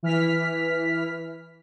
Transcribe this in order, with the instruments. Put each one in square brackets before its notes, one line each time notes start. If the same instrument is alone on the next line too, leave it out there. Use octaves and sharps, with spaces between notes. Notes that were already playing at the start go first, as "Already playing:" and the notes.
[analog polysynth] E3 F6 B6